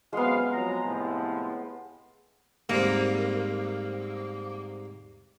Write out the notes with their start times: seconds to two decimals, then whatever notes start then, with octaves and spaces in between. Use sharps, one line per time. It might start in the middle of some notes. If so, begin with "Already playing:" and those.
0.13 F#2 C3 G#3 B3 F5
0.51 F2 F#3 A#5
0.84 A2 C3 F3
2.69 G#2 G3 A#3 C4